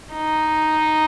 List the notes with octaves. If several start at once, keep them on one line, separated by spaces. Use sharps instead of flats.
D#4